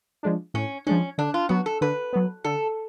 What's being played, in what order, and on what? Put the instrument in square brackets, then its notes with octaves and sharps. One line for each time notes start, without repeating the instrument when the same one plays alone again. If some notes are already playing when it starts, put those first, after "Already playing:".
[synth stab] F3 G#3 D4
[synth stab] A2 [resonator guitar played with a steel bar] C#4
[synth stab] F3 G#3 D4 [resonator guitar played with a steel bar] C#4
[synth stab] D3 [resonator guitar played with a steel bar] D4
[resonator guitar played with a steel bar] F4
[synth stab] F#3 B3 [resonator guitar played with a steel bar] F#4
[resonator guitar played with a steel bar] A4
[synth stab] D3 [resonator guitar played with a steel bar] B4
[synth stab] F#3 B3
[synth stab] D3 [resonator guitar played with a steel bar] A4